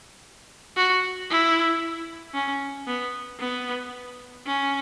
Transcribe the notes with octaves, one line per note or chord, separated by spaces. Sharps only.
F#4
E4
C#4
B3
B3
C#4